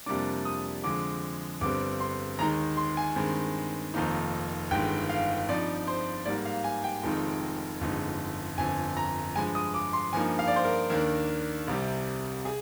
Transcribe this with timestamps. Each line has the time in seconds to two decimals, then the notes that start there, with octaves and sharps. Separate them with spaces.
0.06 F2 C3 G3 A#3 D4 D6
0.45 D#6
0.84 F2 D3 F3 G#3 D6
1.61 G1 G2 D3 G3 C4 D6
2.00 C6
2.39 D#2 D#3 G#3 D#4 A#5
2.77 C6
2.97 G#5
3.16 G2 D#3 G#3 C4
3.94 F1 F2 D#3 A#3 D#4
4.71 G1 G2 D#3 G#3 G5
5.09 F5
5.49 G2 F3 C4 D#4 D5
5.87 C5
6.25 G#2 G3 A#3 D5
6.45 F5
6.64 G#5
6.84 G5
7.03 F1 F2 D#3 G#3 D#4
7.81 G1 F2 D3 G#3 D#4
8.58 G1 F2 D3 G#5
8.97 A#5
9.36 G2 F3 G#3 G#5
9.55 D#6
9.74 D6
9.93 C6
10.13 G2 F3 A#3 D#4 G#5
10.39 F5
10.47 D5
10.56 C5
10.65 A#4
10.90 D#2 D#3 A#3 D4 A#4
11.68 C2 C3 G3
12.45 G#4